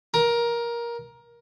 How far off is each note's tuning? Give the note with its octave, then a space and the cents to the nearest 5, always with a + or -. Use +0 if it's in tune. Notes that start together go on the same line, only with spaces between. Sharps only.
A#4 +15